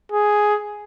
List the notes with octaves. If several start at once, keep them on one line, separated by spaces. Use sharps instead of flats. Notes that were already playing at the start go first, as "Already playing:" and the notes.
G#4